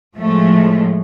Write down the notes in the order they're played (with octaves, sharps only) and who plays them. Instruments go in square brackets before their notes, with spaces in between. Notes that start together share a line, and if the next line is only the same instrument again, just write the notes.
[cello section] A2 F3 G#3 A3